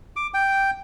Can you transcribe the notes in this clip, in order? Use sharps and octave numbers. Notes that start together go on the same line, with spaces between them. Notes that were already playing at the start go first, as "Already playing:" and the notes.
D6
G5